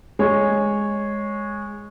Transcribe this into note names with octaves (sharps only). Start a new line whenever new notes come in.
G#3 C#5